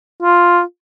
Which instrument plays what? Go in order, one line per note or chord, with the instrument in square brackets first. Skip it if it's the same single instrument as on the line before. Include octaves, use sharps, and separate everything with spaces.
[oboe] F4